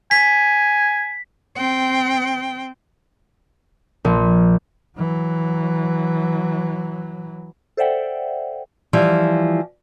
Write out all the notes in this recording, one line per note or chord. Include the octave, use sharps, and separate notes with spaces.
G#5 B6
C4 G5
A#1
E3 F#3
A4 C5 D5 E5 F#5 G5
E3 F3 G3